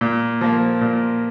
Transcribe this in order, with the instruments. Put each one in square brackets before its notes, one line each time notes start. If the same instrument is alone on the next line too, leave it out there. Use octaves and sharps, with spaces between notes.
[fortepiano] A#2
F3 A#3
A#2